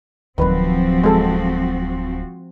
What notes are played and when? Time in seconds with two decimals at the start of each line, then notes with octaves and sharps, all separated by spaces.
0.38 D1 D#3 F3 F#3 C4 F#4 B4
1.04 G#3 A4